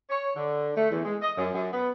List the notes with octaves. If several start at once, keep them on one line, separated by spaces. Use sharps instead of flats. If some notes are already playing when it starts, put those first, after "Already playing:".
C#5
D3
A3
E2
G#3
D#5
F#2
F#2
B3